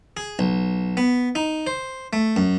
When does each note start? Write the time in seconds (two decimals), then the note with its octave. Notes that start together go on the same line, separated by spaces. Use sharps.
0.17 G#4
0.39 B1
0.97 B3
1.35 D#4
1.67 C5
2.13 A3
2.36 F#2